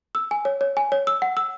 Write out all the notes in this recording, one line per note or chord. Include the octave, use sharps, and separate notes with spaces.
E6
G#5
C#5
C#5
G#5
C#5
E6
F#5
E6